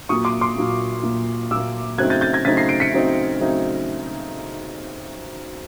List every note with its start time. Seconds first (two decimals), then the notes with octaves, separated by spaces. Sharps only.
0.09 A#2 F#3 A#3 C#6 D#6
0.25 C6 D6
0.41 C6 D6
0.56 A#2 F#3 A#3
1.03 A#2 F#3 A#3
1.51 A#2 F#3 A#3 D6 E6
1.98 C#3 F#3 A3 C4 D#4 F#6 G#6
2.10 G6 A6
2.21 G6 A6
2.33 G#6 A#6
2.45 C#3 F#3 A3 C4 D#4 A6 B6
2.57 A#6 C7
2.68 C7 D7
2.80 B6 C#7
2.92 C#3 F#3 A3 C4 D#4
3.39 C#3 F#3 A3 C4 D#4